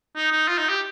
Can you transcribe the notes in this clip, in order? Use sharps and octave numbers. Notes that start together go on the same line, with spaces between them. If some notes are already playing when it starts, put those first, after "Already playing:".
D#4
D#4
F4
D#4
G4